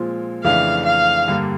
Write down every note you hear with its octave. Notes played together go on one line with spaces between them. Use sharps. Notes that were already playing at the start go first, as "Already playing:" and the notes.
Already playing: A#2 F3 G#3 C4 F4
F2 C#3 E3 A3 D4 F5
F5
G2 D3 G3 A#3